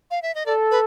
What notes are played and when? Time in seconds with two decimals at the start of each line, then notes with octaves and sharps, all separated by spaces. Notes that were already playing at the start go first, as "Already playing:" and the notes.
0.11 F5
0.22 E5
0.35 D#5
0.46 A4 D5
0.71 B4